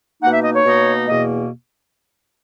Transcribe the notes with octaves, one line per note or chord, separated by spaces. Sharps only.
B2 A#3 D#4 F#5
E5
D#5
C#5
B2 A#3 D#4
E2 B2 A#3 D#5